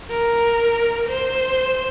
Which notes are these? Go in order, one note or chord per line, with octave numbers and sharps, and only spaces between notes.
A#4
C5